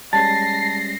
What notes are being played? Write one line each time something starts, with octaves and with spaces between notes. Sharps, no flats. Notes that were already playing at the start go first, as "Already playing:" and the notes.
G3 G#3 C#4 A5 A6 A#6 C7